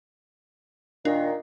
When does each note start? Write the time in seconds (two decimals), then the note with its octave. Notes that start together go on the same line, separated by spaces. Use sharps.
1.05 A#2 D#3 D4